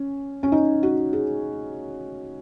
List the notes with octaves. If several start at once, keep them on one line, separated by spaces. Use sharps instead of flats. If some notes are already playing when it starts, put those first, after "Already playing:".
Already playing: C#4
C#4
D#4
F#4
G#4